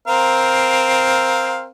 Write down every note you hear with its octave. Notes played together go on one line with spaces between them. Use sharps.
C4 A#4 F5